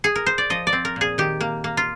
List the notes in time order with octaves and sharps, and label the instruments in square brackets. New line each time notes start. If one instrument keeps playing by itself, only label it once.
[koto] G#4
A#4
C5
D5
F3 D#5
D5
C4
A#4
A#2 G#4
D#3 G4
A#3
A#3
F4